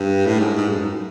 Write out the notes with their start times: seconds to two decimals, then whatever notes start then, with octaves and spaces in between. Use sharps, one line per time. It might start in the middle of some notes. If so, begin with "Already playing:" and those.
Already playing: G2
0.26 A2
0.39 G#2
0.57 G#2
0.70 G2
0.75 F#2